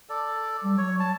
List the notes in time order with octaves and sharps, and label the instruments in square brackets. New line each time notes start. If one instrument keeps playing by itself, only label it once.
[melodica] A4 D5
[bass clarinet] G3
[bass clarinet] F#3 [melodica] C#5
[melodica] A5